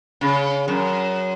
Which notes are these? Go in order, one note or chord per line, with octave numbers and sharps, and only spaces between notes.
C#3
F#2